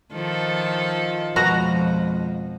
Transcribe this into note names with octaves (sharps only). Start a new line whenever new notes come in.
D#3 F3 A4
F2 B2 F3 G#3 F#4 A#5